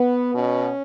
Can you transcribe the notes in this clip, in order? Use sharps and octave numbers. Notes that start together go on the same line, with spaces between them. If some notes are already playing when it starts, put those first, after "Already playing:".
Already playing: B3
B2 C#4